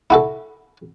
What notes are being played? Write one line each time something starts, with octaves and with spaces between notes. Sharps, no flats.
E4 F#4 A4